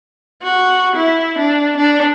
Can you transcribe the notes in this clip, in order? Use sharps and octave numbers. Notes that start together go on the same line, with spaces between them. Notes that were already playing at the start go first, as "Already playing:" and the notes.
F#4
E4
D4
D4